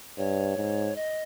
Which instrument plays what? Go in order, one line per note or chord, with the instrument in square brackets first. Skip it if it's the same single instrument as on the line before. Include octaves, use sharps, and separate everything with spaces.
[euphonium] G2 [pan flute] C#5
[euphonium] G#2
[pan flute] D#5